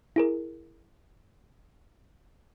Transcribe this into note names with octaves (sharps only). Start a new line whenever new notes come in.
E4 G#4 A#4